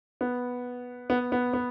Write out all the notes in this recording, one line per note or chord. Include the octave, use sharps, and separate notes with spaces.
B3
B3
B3
B3